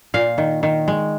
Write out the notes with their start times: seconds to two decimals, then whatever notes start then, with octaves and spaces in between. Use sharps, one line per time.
0.14 A#2 F5
0.38 D#3
0.63 D#3
0.88 G#3